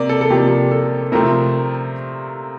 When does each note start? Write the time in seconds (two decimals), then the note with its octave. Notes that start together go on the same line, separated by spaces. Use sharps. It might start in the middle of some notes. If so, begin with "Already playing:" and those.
Already playing: C3 A#3 D5
0.09 A4
0.21 A4
0.30 C3 F3 A#3 G4
0.71 A4
1.12 C3 F3 A3 C4 A#4